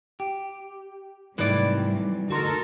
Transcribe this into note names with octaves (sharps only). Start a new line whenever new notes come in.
G4
G#2 C3 D#3 E3 F#3 G3 A3 D5
D2 D#4 F#4 A4 A#4 C6